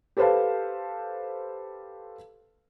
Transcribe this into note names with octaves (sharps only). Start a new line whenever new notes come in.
G4 A4 B4 C5 F5 A5